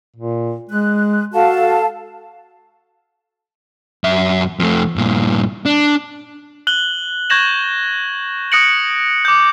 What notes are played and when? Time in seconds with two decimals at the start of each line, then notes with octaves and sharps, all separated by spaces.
0.16 A#2
0.69 G#3 F#6
1.34 F#4 A4 F5 A5
4.04 F#2 E5
4.59 F2 A3
4.96 G2 A#2
5.66 D4
6.67 F#6 F#7 G7
7.30 C#6 G6 G#6 A#6 E7 F#7
8.52 D#6 F#6 A#6 C#7 D7 F#7
9.25 D6 G6